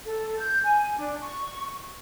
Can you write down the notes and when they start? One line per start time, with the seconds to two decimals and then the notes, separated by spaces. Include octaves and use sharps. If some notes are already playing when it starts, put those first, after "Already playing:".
0.05 A4
0.37 G6
0.63 G#5
0.97 D4
1.21 C#6